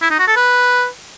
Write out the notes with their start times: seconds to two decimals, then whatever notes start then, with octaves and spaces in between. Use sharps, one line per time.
0.02 E4
0.11 D#4
0.19 F#4
0.28 A4
0.36 B4